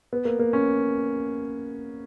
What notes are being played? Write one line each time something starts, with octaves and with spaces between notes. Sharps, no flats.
B3
A#3
A#3
C#4